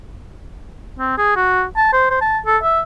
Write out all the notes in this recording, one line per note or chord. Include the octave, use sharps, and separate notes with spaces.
C4
G#4
F#4
A5
C5
C5
A5
A4
E5